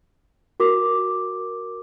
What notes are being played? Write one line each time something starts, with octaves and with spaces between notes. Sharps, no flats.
F#4 A#4 D6